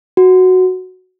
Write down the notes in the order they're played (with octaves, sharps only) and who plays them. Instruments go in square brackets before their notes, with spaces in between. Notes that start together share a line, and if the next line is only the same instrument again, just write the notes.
[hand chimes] F#4